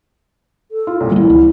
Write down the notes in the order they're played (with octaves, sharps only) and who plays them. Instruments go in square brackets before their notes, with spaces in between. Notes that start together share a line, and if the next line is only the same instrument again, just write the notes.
[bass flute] A4
[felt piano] F4
C2 A#2
[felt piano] A1 [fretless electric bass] G3 A#3 [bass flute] E4
[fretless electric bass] C#2